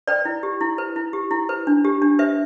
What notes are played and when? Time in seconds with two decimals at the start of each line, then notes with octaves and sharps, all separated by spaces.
0.07 B4 D5 G5
0.25 E4
0.43 G4
0.61 E4
0.78 B4
0.96 E4
1.13 G4
1.31 E4
1.49 B4
1.67 D4
1.85 G4
2.02 D4
2.19 B4 E5